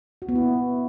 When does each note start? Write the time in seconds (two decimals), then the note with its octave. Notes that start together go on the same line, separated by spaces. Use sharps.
0.22 F#4
0.29 B3
0.35 E4